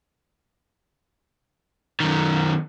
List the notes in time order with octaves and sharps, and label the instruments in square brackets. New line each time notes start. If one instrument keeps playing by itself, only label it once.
[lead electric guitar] F#2 D#3